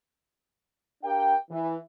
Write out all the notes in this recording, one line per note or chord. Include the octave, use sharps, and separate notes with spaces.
D4 G4 A#4 F5 G5
E3